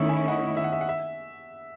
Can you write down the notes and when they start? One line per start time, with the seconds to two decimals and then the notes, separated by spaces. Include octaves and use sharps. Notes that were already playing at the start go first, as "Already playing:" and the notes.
Already playing: D#3 A3 C#4 E4 C#6 D#6 E6
0.08 E5 G#5
0.28 D#5 F#5
0.57 E5
0.64 F#5
0.72 E5
0.81 F#5
0.89 E5